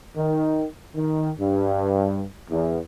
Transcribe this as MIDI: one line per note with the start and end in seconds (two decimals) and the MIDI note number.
0.16 0.67 51
0.95 1.31 51
1.39 2.26 43
2.50 2.79 40